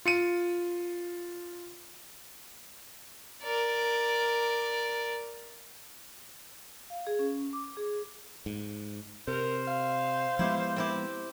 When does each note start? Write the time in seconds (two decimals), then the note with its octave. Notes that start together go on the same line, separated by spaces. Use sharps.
0.05 F4 C#7 D#7
3.42 A#4 D5
6.90 F5
7.07 G#4
7.19 C#4
7.53 D6
7.77 G#4
8.46 G#2
9.28 C3 A#4 C5
9.67 F5
10.39 F3 G#3 B3 E4 G4
10.76 C4 E4 G4